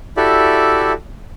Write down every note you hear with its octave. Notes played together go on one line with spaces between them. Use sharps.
E4 F#4 G4 A4 D5 E5